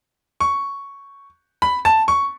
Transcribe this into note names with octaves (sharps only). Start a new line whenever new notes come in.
C#6
B5
A5
C#6